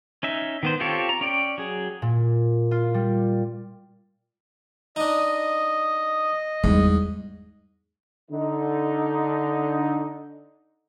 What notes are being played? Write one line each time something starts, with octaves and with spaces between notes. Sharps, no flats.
C#4 D#4 E5
D#3 B3 C5
C4 F4 G4 A4 C#5
A#5
C#4 D5 G5
F#3 G#4
A#2
F4
G3
D4 D#4 D#5
E2 G#2 G3
D3 D#4